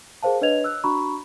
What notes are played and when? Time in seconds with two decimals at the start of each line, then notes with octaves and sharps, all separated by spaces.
0.23 G#4 A#4 C5 F5 A5
0.41 D4 B4 C#5 D#5 G#6 F7
0.64 E6 F#6
0.84 D4 F#4 A#5 B5 C#6